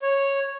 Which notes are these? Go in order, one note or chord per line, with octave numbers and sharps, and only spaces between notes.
C#5